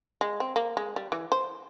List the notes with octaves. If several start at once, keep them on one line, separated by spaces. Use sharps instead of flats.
G#3
C4
A#3
G#3
G3
E3
C5